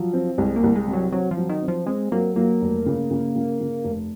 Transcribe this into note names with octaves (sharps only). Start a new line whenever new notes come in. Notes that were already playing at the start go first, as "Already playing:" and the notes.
Already playing: F3 F#3
C4
C2 G#3
A#3
C2
G#3
C3
F#3
F#3 C4
F3
F#3
D#3
C4
F3
G#3 C4
F#3 A#3
F#3 A#3
F1
C#3
C#3
C#3
C#3
F1